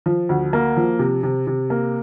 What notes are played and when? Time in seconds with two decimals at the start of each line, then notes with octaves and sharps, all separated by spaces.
0.06 F3
0.29 D2
0.53 A#3
0.77 F3
0.99 C3
1.23 C3
1.47 C3
1.70 A#3